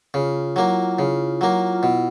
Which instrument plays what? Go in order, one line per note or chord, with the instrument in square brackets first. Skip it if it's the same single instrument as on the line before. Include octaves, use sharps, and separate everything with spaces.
[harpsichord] C#3 [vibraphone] F4
[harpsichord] F#3 A#3 [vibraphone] E4
[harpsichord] C#3 [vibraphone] F4
[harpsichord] F#3 A#3
[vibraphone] F4
[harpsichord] B2 [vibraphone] E4